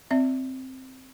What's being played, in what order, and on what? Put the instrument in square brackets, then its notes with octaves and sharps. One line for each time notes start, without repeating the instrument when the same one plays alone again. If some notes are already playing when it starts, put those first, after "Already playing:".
[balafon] C4 D5 E5